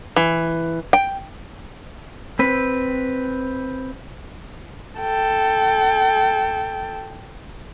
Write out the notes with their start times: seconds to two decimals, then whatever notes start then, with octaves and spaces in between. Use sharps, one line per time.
0.16 E3
0.93 G5
2.39 C4 B4
5.00 A4 G5